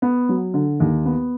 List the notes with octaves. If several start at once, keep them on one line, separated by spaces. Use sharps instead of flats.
B3
F#3
D3
D#2
B3